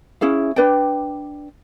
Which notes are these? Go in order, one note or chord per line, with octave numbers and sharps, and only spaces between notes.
C#4 E4 G#4 F5
D4 B4 D5 G5